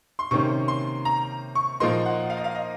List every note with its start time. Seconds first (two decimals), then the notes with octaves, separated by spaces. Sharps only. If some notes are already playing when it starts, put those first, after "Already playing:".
0.19 C6
0.31 C3 D#3 A#3 C#4 C#6
0.68 C6
1.05 A#5
1.55 C#6
1.80 A#2 F3 A#3 D#4 C6
2.06 F#5
2.30 F5
2.37 D#5
2.44 F5
2.55 D#5